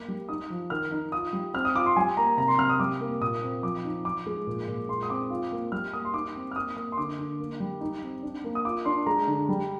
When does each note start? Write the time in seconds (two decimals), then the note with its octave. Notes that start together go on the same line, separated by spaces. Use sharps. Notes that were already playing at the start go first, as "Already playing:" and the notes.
Already playing: A#3 D6
0.08 G3
0.29 D#4 D#6
0.50 F3
0.70 D#3 F6
0.92 D#4
1.12 F4 D#6
1.33 G3
1.54 C4 F6
1.65 D#6
1.75 F4 D6
1.86 C6
1.97 G3 G#5
2.17 A#3 A#5
2.37 C3 A#5
2.48 C6
2.59 C3 F6
2.69 D#6
2.80 G3 D6
3.01 A#3
3.21 A#2 D#6
3.42 C4
3.63 F3 D6
3.84 D#4
4.05 F3 D6
4.26 G#3
4.47 A#2
4.68 A#2
4.88 G#3 C6
5.03 D#6
5.09 C4 D6
5.30 F4
5.52 A#3
5.72 G3 F6
5.93 A#3 D#6
6.05 C6
6.14 D#4 D6
6.35 C4
6.51 F6
6.56 A#3 D#6
6.76 A#3 D#6
6.92 C6
6.98 D3 D6
7.18 D3
7.40 A#3
7.60 G3
7.81 D#4
8.02 C4
8.23 D4
8.44 A#3
8.55 D#6
8.65 F4 D6
8.85 D4 C6
9.07 G#3 A#5
9.27 D3
9.49 G3